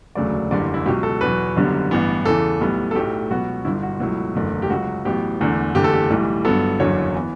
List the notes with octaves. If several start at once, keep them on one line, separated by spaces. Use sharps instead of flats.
E1 D2 C#3 F#3 A3 D5
F#1 E2 D3 G3 D5
E4
C#2 B2 F#3 G4
A4
E2 B2 F#3 B4
F#1 F#2 D3 G3 B3
A1 G2 E3 B3
E2 C#3 E3 A4
B1 A2 G3 B3
A4
B1 A2 F#3 A3 G4
C#2 B2 F#3 B3 F#4
G1 G2 D3 E4
F#4
C#2 B2 F#3 A3 E4
F#1 E2 D3 A3
G4
C#2 C#3 F#3 F#4
A1 A2 F#3 B3 G4
E1 E2 D3 A3
F#1 E2 D3 A3 G4
A4
G4
B1 A2 E3 G3
G1 G2 F#3 B3 A4
F#1 E2 D3 F#3 C#5
E3 B3